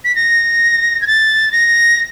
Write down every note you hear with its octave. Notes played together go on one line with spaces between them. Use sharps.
B6
A#6
G#6
A6
A#6